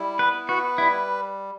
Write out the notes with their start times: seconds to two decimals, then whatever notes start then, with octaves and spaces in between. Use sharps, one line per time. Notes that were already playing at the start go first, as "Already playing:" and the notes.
Already playing: G3 E4
0.19 B3 B4
0.49 F#4 B4
0.78 G3 E4